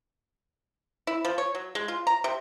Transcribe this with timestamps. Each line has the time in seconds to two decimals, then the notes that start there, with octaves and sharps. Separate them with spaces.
1.07 E4
1.25 F3
1.38 C#5
1.55 F#3
1.75 G#3
1.88 F4
2.07 A#5
2.24 C3